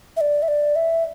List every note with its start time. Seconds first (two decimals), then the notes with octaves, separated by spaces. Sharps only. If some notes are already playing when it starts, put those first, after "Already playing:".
0.17 E5
0.21 D5
0.42 E5
0.48 D5
0.76 E5